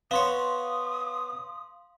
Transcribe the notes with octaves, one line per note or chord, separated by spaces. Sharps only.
B3 C#5 F5 C6 D#6